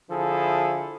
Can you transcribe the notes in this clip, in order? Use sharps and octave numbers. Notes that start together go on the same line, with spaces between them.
D3 F3 E4 G#4 A4